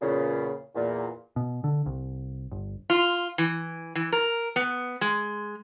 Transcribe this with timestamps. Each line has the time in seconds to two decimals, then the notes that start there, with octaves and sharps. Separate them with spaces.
0.01 E2 A#2 C#3
0.75 E2 A#2
1.36 B2
1.64 D3
1.86 C2
2.51 G1
2.90 F4
3.38 E3
3.95 E3
4.13 A#4
4.56 B3
5.01 G#3